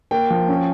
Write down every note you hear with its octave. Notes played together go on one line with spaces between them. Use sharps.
A#3 G5
F3
C#4